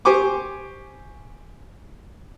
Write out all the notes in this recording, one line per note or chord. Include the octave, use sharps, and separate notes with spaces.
G4 C5 G#5 C#6 D6